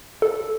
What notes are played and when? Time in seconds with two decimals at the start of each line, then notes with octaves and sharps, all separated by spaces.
0.22 A4